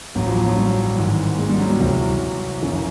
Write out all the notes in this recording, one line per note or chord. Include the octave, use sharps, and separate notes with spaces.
A1 A2 E3 F#3
F3
F#3
F#3
G3
G#1 G#2 E3
G#3
G3
F#3
G3
C2 C3 E3 F#3
G1 F#2 C#3 E3